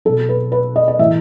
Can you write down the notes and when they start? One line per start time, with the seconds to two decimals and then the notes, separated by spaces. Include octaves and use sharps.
0.05 F#3 A4
0.09 B2
0.29 B4
0.52 B4
0.76 D#5
0.88 D#5
0.99 A2 E3 E5